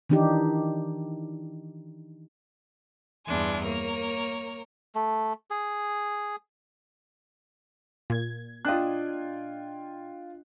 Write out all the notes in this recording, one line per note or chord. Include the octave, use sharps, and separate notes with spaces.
D#3 E3 D4 D#4 G4
E2 G2 D4 G#5 C6
A#3 A#4 C#5
A3
G#4
A#2 G#6
D4 F4 D#5 G5 F#6